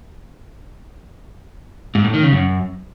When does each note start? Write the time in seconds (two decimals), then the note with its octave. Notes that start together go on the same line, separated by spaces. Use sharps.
1.95 G#2
2.04 A2
2.14 D#3
2.23 C#3
2.33 F#2